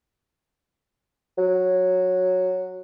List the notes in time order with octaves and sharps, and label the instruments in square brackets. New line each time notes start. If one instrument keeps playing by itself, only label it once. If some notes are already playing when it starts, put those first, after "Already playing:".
[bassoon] F#3